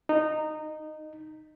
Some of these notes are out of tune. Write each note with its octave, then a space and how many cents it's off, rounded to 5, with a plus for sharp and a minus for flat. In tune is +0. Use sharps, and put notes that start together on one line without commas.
D#4 -15